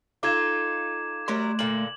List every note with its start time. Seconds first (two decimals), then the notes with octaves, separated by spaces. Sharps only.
0.23 D#4 F4 A4 D6 G#6 E7
1.28 F#3 G3 A3 A#4 C6
1.59 A#2 D3 F#7